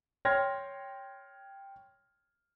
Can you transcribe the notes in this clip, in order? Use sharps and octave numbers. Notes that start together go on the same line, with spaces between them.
C#5 G5 C6 F6 G#6 A#6